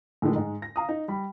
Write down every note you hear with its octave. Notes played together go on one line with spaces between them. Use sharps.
A2 D3 D#3 F3 G#3 A3
G#2 G#3
A#6
F5 A#5 D#6
D#4
G3 B5